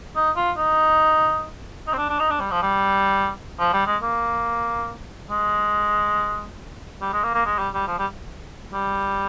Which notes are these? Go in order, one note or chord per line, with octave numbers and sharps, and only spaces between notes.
D#4
F4
D#4
D#4
C4
D4
D4
D#4
D4
G3
F3
G3
F3
G3
G#3
A#3
G#3
G3
G#3
A#3
A#3
G#3
G3
G3
F3
G3
G3